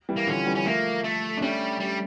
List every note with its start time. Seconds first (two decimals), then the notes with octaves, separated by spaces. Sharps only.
0.09 E3 G3
0.16 A#3
0.27 D3 F3 C#4
0.46 E3 G3
0.55 C#4
0.65 F3 A3 A#3
1.04 A3
1.37 D4
1.42 G3 A3 C#4
1.80 G3